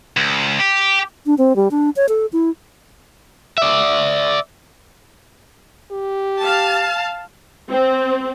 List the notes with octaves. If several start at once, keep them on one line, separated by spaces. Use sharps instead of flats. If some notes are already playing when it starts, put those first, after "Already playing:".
C#2
G4
D4
C4
G3
D4
C#5
A4
E4
D5 E5
G4
F5 A5
C4